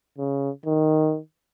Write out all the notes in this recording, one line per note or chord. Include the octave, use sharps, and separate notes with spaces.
C#3
D#3